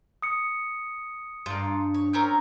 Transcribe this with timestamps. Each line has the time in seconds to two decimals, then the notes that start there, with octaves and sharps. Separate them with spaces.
0.22 D#6 C#7
1.46 G2 A#3 F4
1.94 C#5
2.13 C4 C#4 A#4 G6